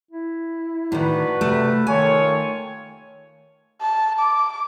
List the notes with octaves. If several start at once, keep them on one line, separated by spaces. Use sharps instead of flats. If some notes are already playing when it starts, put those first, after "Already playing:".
E4
A2 D#3 D4 F#4 B4
C3 A3
D#3 F4 A4 C#5 G#5
A5
D6